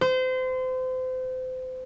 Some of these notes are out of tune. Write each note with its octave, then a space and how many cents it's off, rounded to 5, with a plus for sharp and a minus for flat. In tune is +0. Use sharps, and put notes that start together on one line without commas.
C5 -30